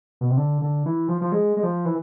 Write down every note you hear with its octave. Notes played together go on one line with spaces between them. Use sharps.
B2
C3
D3
D3
E3
F3
F3
G#3
G#3
F3
E3